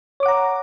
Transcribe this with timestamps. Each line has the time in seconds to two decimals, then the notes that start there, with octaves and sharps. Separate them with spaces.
0.20 C#5
0.23 D6
0.26 F#5
0.28 A#5